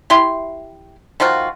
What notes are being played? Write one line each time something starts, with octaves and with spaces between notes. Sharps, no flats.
E4 G4 C6
D#3 F3 F4 F#4